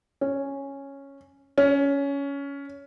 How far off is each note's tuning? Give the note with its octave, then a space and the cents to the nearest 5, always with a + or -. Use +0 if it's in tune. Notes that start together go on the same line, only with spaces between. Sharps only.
C#4 -5
C#4 +15